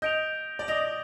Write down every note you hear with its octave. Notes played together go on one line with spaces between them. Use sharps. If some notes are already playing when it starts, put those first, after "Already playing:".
D#5 G6 D7 F7
D5
D#5 D#6 A#6 F7